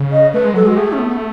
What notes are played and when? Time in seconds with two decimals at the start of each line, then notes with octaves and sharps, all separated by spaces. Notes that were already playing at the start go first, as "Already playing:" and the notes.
Already playing: C#3
0.12 D#5
0.34 A3 B4
0.44 G#3
0.54 F#3 A4
0.63 G#3 F#4
0.77 A3 G#4
0.92 C#4
0.99 B3